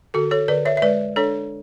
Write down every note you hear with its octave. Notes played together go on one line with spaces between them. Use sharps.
D3 F#4 A4
A4 C#5
D3 B4 D5
C#5 E5
E5
G#3 B4 D5
D4 A4 C#5